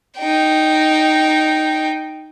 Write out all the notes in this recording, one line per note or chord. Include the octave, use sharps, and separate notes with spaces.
D#4 G5